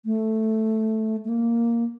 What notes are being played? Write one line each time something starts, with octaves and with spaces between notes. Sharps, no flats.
A3
A3
A#3